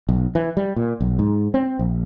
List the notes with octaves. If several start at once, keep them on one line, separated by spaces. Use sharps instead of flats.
B1
E3
G3
A#2
B1
G#2
C4
A#1